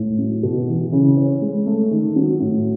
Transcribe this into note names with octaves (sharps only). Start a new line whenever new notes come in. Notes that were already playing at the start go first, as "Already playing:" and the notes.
Already playing: A2
F#3
B2
E3
C#3
C#4
G#3
A3
D#3
F#3
A2